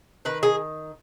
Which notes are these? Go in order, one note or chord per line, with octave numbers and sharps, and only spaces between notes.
D#3 B4
G#4